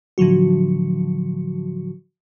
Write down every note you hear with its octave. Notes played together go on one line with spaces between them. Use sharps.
A2 D3 F3 F#3 F#4